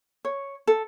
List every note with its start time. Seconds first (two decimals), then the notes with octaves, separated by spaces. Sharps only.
0.25 C#5
0.67 A4